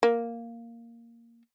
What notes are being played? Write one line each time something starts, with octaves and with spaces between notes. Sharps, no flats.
A#3